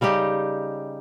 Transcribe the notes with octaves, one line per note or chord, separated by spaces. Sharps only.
C#3 G3 D#4 G4